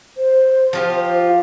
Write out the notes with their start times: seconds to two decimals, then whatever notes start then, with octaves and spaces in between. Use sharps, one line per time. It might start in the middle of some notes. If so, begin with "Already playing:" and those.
0.17 C5
0.73 F3 F4 G4